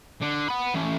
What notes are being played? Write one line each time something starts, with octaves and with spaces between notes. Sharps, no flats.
D3
F#5 B5
E3 C#4